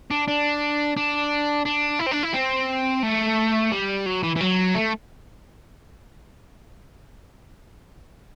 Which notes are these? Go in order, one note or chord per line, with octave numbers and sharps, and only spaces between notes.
D4
D4
D4
D4
E4
C4
D4
E4
C4
A3
G3
F#3
E3
E3
F#3
A3